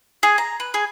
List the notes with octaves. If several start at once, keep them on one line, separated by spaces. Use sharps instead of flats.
G#4
A#5
B4
G#4